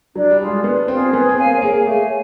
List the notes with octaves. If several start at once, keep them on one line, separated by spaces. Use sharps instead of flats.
F#3 D4
G3
F4 G#4
G#3
B3 D4
C4 F4 G#4
B3 G#4
C4
C#5 F5 G#5
A#3
A#3 G#4
A3 C#5 F5 G#5